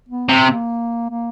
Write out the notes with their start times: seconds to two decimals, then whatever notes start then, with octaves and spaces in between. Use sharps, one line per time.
0.09 B3
0.29 C3 C4
0.49 A#3
1.10 A#3